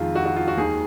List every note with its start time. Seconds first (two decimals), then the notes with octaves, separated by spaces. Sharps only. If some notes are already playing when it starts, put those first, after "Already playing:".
Already playing: F2 D#3 G#3 F4
0.15 F#4
0.26 F#4
0.36 F4
0.48 F#4
0.57 D#2 D#3 G#3 G#4